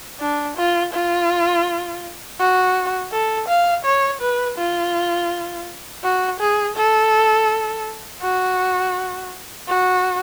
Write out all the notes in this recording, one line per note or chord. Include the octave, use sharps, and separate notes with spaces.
D4
F4
F4
F#4
A4
F5
C#5
B4
F4
F#4
G#4
A4
F#4
F#4